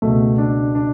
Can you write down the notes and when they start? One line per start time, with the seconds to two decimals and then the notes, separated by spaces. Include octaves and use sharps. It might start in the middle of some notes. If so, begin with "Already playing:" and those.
0.02 C#2 B2 A3
0.38 D4
0.75 D4